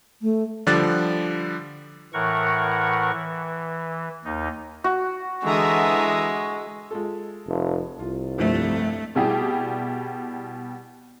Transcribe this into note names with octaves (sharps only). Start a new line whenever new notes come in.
A3
D3 F3 G3 D6 F#6 A6
A2 E3 A#4 F#5 C#6
E3
D#2 D#4
F#4
D3 E3 G#3 E5 A#5 D#6
G#3 F4 A4
F1
C2 F4
G1 F2 A3 C4
B2 G3 E4 G4 G#4